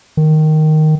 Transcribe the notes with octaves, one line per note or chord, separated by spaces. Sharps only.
D#3